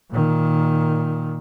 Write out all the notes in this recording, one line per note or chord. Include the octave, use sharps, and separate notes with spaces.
A#2 D#3